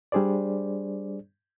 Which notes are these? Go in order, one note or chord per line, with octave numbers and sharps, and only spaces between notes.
G3 D4 G#4 C5 D5